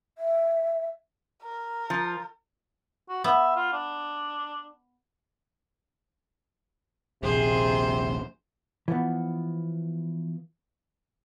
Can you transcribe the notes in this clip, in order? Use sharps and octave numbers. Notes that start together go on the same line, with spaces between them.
E5
A#4
F3
F#4
B3 E5
F4
D4
D#1 A#1 C3 G#4 C5
E3 F3 B3